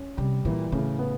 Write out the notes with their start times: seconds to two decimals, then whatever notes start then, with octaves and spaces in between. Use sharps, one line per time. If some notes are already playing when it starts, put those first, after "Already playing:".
Already playing: C#4
0.17 C3 G3
0.45 A#2 E3
0.72 A2 C#3
0.99 B3